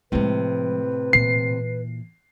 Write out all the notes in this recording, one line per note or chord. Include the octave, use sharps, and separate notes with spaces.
A2 C3 F3 G#3 B4
A#2 E3 C7